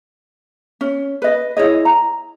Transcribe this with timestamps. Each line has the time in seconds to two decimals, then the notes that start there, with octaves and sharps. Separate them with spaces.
0.81 C#4
1.22 B4 D#5
1.57 E4 G#4 C#5 D#5
1.85 A#5